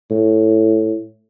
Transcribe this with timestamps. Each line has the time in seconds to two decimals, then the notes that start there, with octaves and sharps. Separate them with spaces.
0.11 A2